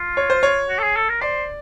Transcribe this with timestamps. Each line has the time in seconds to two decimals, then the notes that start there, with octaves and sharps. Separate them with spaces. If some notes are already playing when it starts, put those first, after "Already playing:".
Already playing: F4
0.17 C#5
0.30 C5
0.43 C#5
0.69 F#4
0.79 A4
0.83 G#4
0.96 A4
1.09 A#4
1.22 C5 D5